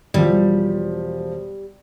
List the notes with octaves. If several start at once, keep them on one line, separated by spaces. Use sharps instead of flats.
E1 F3 G3